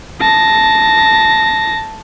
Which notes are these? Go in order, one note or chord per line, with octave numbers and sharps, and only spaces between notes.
A5 A#6